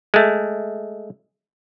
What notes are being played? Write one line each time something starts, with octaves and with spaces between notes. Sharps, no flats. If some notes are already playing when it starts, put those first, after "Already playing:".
G#3 A3